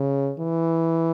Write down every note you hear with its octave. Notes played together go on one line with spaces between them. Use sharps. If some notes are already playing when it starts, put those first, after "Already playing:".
Already playing: C#3
E3